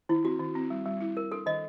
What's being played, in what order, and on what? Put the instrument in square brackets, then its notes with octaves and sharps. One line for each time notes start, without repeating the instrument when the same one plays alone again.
[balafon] D#3 [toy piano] E4
[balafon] C4 [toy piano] F#4
[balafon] D#3
C4
G3
G3
E4
[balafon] E4 [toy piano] A#4
[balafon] D4 [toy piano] A4
[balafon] D#3 [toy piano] D#5